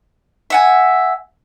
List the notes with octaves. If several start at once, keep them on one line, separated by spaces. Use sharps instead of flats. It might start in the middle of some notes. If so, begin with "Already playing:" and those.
E5 F#5 G#5